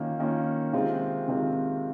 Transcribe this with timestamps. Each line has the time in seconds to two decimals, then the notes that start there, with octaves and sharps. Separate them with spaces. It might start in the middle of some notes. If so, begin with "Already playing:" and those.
Already playing: D#3 A#3 C#4 F4
0.20 D#3 A#3 C#4 F4
0.73 C3 D#3 G#3 C4 F4
1.28 C3 D#3 G#3 C4 F4